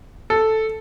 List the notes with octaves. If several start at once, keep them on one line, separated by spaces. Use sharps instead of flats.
A4